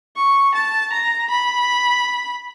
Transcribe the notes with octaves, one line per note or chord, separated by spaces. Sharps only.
C#6
A5
A#5
B5